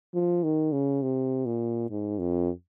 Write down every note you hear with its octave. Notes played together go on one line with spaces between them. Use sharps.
F3
D#3
C#3
C3
A#2
G#2
F2